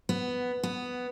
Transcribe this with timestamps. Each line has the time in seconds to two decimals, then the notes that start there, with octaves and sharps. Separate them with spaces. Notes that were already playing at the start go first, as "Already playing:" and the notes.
0.09 B3
0.63 B3